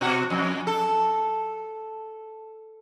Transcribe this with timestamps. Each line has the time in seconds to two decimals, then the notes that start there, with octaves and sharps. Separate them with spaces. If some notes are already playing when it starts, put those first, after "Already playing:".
0.01 B2 F#4
0.30 F2
0.67 A4